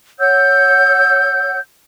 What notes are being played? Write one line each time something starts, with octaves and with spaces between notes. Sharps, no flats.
C#5 F#5 E6 G6